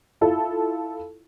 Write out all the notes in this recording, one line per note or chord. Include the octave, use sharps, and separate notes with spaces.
E4 F4 A4